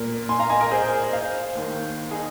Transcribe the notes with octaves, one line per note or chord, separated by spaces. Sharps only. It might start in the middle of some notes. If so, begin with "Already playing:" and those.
Already playing: A#2 A#3
G#5 C6
F5 A#5
D#5 G#5
A#4 D#5
G#4 C5
D#5
C5 F5
D#2 D#3 A#3
D#4 G#4